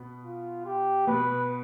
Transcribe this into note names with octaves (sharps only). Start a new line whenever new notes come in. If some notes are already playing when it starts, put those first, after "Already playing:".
Already playing: B2 B3
F4
G4
B2 B3 B4